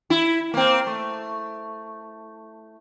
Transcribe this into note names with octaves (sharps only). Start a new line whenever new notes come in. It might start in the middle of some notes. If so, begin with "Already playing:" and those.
E4
A#3 C4
A3